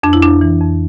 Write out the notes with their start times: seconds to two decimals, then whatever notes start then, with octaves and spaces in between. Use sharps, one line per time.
0.03 F2 D4
0.13 E4
0.22 F2 D4
0.41 E3
0.61 F2